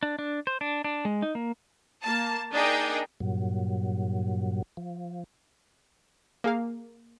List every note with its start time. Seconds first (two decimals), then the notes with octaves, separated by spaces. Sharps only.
0.03 D4
0.19 D4
0.47 C5
0.61 D4
0.84 D4
1.05 G#3
1.22 D#4
1.35 A#3
2.02 A#3 A5
2.52 D4 D#4 G#4 A#4 D#5 G5
3.20 G2 A#2 F#3
4.77 F3
6.44 A#3 G#4 F5